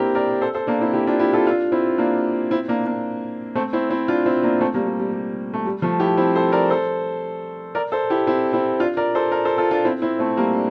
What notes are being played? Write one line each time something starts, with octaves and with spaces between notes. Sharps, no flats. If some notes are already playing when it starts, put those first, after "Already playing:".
Already playing: A#3 C4 D4 E4 G4 A#4
A#4 D5
A4 C5
A4 C5
A#3 D4
C4 E4
E4 G4
D4 F4
E4 G4
F4 A4
D4 F4
C4 E4
A#3 D4
C4 E4
A#3 D4
A#3 D4
A3 C4
C4 E4
C4 E4
D4 F4
C4 E4
A#3 D4
A3 C4
G3 A#3
G3
G3
G3
A3
G3
F3 A3
E4 G4
C4 E4
A4 C5
A#4 D5
A4 C5
A#4 D5
A4 C5
E4 G4
C4 E4
C4 E4
D4 F4
A#4 D5
A4 C5
A#4 D5
A4 C5
F4 A4
D4 F4
C4 E4
C4 E4
A3 C4
G3 A#3
D4